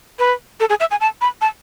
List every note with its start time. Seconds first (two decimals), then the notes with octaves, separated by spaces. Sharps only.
0.19 B4
0.60 A4
0.70 G#4
0.80 E5
0.91 G#5
1.01 A5
1.21 B5
1.41 A5